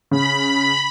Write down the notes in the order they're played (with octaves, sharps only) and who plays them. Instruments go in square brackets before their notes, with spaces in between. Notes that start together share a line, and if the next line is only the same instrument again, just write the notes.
[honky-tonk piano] C#3 [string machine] B5